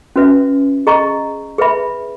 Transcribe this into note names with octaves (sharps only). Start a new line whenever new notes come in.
C#4 F#4 B4 E5
G#4 D#5 A#5 C#6
G#4 B4 E5 B5